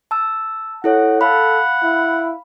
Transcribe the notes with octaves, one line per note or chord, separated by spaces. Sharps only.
A5 E6
E4 A4 C#5 F#5
A4 F5 F#5 B5
E4